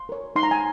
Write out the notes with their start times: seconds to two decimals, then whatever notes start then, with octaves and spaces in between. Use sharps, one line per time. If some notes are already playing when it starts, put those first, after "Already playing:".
Already playing: C6
0.09 A#4 C#5
0.36 D#4 C6
0.43 A#5
0.51 G#5